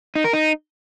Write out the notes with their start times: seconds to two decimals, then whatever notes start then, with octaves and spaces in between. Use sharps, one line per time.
0.15 D#4
0.24 A#4
0.33 D#4